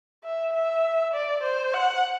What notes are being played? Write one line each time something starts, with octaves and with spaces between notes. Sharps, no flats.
E5
E5
D5
C5
F#5